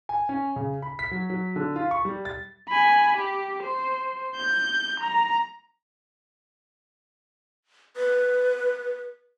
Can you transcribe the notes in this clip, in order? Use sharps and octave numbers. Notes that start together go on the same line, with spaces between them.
G#5
C#4
C#3
B5
B6
F#3
F#3
D3
F4
C#6
G3
A6
G#5 B5
G4
C5
G6
A#5
B4